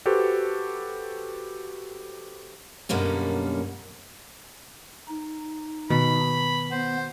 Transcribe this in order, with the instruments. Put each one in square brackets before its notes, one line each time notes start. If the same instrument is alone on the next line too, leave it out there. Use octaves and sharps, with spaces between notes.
[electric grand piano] F#4 G4 A4 B4 C5
[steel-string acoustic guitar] F#2 B2 D3 G3 A#3 C#4
[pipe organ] D#4
[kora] B2 [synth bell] D#3 [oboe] B5
[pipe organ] B3 [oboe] C5